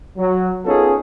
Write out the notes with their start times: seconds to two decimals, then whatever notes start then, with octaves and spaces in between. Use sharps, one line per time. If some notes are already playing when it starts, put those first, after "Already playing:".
0.18 F#3
0.66 B3 C#4 D#4 F4 G#4 A4